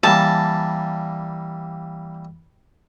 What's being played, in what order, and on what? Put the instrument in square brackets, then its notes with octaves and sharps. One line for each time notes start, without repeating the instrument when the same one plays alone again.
[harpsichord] E3 G3 A#3 [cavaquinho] A5